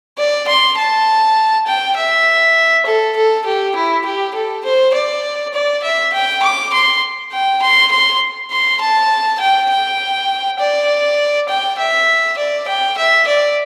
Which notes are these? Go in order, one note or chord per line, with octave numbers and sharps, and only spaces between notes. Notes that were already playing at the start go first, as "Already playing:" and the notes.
D5
C6
A5
G5
E5
A4
A4
G4
E4
G4
A4
C5
D5
D5
E5
G5
D6
C6
G5
C6
C6
C6
A5
G5
G5
D5
G5
E5
D5
G5
E5
D5